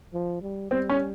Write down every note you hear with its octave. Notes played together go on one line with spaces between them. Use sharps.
F3
G3
G3 C4
C#4